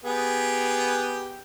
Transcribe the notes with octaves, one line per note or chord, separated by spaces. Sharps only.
B3 G4 G#4